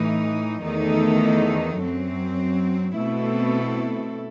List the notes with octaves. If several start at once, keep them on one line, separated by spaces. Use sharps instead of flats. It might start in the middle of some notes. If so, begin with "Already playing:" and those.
Already playing: A2 E3 A3 D#4
E2 D#3 A3 D#4 A4
F#2 F#3 C4
B2 A3 C4 E4 A4